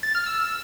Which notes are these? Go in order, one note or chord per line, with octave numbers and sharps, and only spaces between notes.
A6
F6
E6